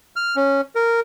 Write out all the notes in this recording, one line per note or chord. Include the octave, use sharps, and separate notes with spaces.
F6
C#4
A#4